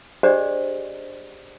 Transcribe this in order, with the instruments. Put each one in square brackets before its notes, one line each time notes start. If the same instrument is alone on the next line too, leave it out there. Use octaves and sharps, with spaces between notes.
[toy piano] D4 G4 G#4 C5 D5 D#5